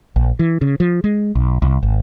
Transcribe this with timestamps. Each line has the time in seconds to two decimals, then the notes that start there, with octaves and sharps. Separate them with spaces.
0.16 A#1
0.39 E3
0.61 C#3
0.80 F3
1.04 G#3
1.35 B1
1.62 C2
1.83 G#1